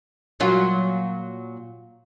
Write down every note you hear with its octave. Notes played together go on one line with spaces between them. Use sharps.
A#2 F#3 F4